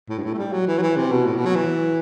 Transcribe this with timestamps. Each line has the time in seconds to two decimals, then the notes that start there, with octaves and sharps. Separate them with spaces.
0.09 A2
0.19 G2
0.23 A2
0.33 A3
0.38 G3
0.53 F#3
0.67 E3
0.78 F#3
0.82 E3
0.97 C3
1.11 B2
1.26 A2
1.36 B2
1.46 F#3
1.55 E3